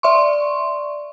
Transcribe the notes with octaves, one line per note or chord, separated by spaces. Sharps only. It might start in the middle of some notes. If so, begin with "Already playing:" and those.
D5 E5 C6 C#6